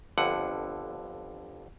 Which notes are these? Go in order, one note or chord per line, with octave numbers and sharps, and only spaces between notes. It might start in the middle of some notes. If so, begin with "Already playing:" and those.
G1 F2 D3 F#5